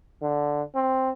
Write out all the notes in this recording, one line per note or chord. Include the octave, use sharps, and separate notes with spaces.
D3
C4